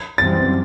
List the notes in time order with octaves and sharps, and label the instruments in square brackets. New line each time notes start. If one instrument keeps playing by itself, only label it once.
[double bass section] F#2 E3 G3 C4 [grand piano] A6